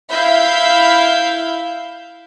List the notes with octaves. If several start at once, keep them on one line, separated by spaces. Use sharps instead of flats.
E4 E5 F5 B5 G6